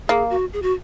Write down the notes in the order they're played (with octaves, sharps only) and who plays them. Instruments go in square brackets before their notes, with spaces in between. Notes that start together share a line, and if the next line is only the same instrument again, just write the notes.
[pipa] A#3 [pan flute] G#4
[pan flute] F#4
G#4
F#4